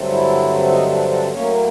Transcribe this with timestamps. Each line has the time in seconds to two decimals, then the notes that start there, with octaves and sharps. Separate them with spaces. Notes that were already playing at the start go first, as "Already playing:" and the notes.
Already playing: G2 D3 F#3 A3 C4
0.10 E4
0.70 D#4
0.91 D4
1.10 D4
1.30 A2 F#3 A#3 C#4